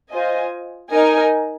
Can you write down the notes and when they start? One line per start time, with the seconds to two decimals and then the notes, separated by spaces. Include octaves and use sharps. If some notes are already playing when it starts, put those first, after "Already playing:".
0.10 F4 C5 D#5 G#5
0.91 D#4 A#4 D#5 G#5